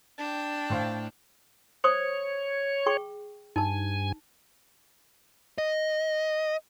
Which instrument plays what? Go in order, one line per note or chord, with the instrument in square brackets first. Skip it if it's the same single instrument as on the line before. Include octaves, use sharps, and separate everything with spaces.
[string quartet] D4 G5
[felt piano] A2 C5 F5
[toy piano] C5 C#6 D#6 [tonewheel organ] C#5
[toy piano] G#4 G5 C#6
[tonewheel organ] G2 G#5 [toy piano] D#4 A5
[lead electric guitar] D#5